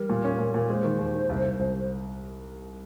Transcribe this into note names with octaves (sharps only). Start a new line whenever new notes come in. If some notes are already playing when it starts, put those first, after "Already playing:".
Already playing: G3 A#4
A#2
C#4
A#2
A#2
G#3 C5
D#3
D#2
D#3
C2
C2
C2